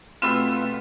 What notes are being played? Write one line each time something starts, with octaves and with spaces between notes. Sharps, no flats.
B2 A3 C4 F4 G4 B4 E6